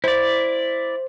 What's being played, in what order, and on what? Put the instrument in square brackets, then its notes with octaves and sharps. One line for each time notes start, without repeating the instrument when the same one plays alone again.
[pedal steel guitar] E4 D5 [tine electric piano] C5